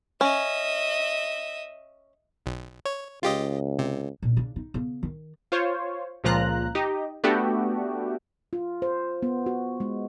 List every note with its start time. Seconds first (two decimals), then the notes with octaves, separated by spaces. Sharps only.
0.21 C#4 D#5 E5
2.46 B1
2.85 C#5
3.23 C#2 F4 G4 D#5
3.79 C3
4.22 A#2
4.37 C#3 D4
4.56 D#4
4.74 C#3 B3
5.03 D#3
5.52 F4 C5 C#5
6.24 C#2 A#2 F3 F4 A#5 F#6
6.75 D#4 G4 D#5
7.24 A3 B3 D4 F#4 G4
8.53 F4
8.82 C5
9.23 B3
9.46 F#4
9.80 G#3